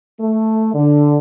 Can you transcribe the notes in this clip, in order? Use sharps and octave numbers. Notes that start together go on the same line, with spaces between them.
A3
D3